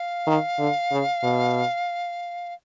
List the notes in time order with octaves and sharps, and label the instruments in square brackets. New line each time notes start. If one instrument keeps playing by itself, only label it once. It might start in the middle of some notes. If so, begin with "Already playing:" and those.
Already playing: [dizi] F5
[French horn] D#3
D3
C#3
B2